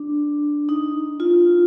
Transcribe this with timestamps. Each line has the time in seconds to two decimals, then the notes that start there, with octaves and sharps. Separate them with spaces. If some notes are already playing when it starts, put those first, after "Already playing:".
Already playing: D4
0.69 D#4
1.20 F4